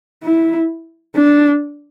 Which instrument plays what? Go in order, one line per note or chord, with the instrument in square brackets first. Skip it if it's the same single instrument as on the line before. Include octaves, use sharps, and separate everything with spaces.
[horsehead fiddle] E4
D4